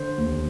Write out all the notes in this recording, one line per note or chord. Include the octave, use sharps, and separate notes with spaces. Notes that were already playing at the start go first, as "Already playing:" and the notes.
Already playing: D3 C5
D#2